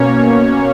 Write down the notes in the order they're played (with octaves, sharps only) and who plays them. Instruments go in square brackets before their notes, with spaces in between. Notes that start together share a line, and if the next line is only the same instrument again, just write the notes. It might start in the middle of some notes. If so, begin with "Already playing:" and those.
Already playing: [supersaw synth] B2 A#3 C#4 C#5